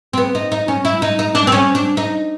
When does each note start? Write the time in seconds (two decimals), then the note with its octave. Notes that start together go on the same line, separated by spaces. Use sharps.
0.13 C4
0.18 B3
0.35 D#4
0.52 D#4
0.68 C#4
0.85 E4
1.02 D#4
1.19 D#4
1.35 D4
1.47 C4
1.52 C#4
1.75 D4
1.97 D#4